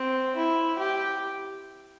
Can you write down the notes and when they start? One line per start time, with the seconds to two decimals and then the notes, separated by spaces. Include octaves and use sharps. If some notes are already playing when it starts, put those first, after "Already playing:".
Already playing: C4
0.36 E4
0.78 G4